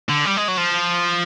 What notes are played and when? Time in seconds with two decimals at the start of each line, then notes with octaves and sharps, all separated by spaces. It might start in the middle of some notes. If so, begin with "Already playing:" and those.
0.09 D3
0.25 G3
0.37 G#3
0.48 F#3
0.57 F3